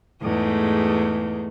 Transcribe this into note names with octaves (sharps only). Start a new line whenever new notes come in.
E2 G#2 A3